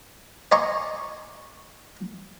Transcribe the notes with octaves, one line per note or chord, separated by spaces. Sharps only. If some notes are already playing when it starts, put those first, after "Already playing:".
D5 D#5 G#5 A#5 C6 C#6